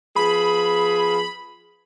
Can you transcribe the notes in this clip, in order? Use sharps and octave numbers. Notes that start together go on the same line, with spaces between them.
F3 B3 G#4 B5